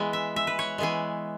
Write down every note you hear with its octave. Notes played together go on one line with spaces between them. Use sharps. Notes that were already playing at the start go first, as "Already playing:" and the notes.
Already playing: E3 G#3 B3
E5
E5
B4
C#5
E3 G#3 B3 G#4